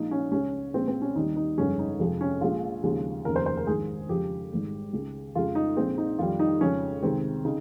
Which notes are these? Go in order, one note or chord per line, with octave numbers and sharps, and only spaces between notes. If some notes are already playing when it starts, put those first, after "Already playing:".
Already playing: A#1 A#2 F3 G#3 D#4
C#4
C#2 C#3 G#3 C#4
A#1 A#2 G#3 C4
C4
C#4
D#2 D#3 G3 D#4
D#4
G1 F2 C#3 G#3 C#4
D#4
F2 C3 F3 G#3
C#4
A#1 A#2 G#3 F4
D#2 C#3 F3 G#3
F1 D#2 C#3 A#4
C5
C5
A#4
A#1 G#2 D#3 G#3 G#4
F2 C#3 F3 G#3 G4
G#1 G#2 G3
C#2 C#3 G#3
F2 C#3 F3 G#3 F4
D#4
A#1 A#2 G#3 C4
D#4
F2 D#3 G3 F4
D#4
F2 C#3 F3 G#3 C#4
C#2 C3 D#3 G#3 C4
C#3 D#4